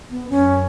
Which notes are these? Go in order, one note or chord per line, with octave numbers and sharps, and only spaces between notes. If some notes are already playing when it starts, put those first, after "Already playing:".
B3
F#2 C#4